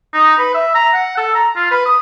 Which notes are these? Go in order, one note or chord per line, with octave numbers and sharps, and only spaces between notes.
D#4
B4
E5
A#5
F#5
A4
A#5
F4
B4
D#6